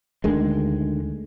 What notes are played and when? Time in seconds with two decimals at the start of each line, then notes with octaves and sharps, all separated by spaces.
0.24 D2 D3 D#3 G#3